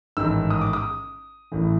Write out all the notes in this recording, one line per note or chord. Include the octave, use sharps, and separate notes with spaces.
A1 G#2 D#3 E6
D#6
D6
D#6
A1 A2 E3